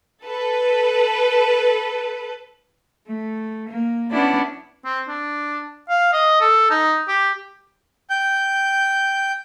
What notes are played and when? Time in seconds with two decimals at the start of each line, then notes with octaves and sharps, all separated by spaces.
0.24 A4 B4
3.07 A3
3.67 A#3
4.10 B3 C#4 D4 E4 D5
4.85 C4
5.08 D4
5.89 F5
6.13 D#5
6.41 A4
6.70 D#4
7.08 G4
8.10 G5 G6